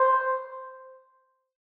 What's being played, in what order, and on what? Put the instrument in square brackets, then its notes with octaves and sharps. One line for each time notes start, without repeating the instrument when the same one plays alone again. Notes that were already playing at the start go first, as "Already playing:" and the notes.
Already playing: [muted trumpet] C5